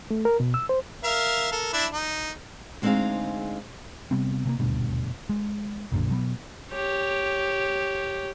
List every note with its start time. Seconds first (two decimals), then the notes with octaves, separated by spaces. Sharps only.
0.11 A3
0.25 A#4
0.40 B2
0.54 E6
0.69 C5
1.04 A#4 E5 F5
1.52 A4 A#4
1.73 D4 E4 E5
1.91 D#4
2.82 D2 G#3 C4 D#4 G#4 F5
4.11 C3 G3 B3 C4
4.45 C3 A3 A#3
4.59 D#1 D2 G2 B2
5.29 G#3
5.92 B1 F#2 A#2 D3
6.10 B2 F#3 A3 B3
6.72 G4 C#5